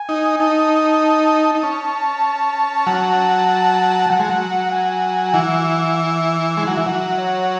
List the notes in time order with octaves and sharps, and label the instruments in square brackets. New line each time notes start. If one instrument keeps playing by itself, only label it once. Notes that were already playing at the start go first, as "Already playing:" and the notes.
Already playing: [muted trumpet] G#5
[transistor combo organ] D#4
[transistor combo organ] D#4 [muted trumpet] A5
[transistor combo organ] D#4
C#4
[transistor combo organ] F#3 [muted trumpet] A5
[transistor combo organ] F#3 [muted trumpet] F#5
[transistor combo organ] G#3
F#3
[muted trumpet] G#5
[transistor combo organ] E3 [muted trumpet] F#5
[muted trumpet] E5
[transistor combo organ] G#3
F#3
E3
F#3
[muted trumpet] C#5